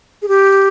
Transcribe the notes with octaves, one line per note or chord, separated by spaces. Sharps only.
G#4
G4